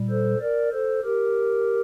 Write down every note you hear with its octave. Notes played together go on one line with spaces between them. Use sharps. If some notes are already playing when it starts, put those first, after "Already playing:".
Already playing: A#2 G3
A4 C5
A#4 D5
A4 C5
G4 A#4